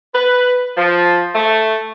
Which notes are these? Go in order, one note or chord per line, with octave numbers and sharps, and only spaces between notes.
B4
F3
A3